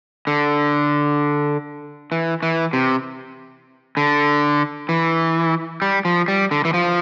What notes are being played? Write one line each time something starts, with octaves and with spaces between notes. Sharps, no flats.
D3
E3
E3
C3
D3
E3
G3
F3
G3
D3
E3
F3